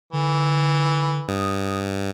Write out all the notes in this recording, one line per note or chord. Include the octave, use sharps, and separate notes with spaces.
D3 E3
G2 D#6